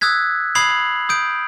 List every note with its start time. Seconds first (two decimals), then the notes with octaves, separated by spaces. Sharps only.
0.01 D#6 E6 F#6 G#6 B6
0.55 B5 D#6 G#6 C7 F7 F#7
1.09 D#6 G6 D7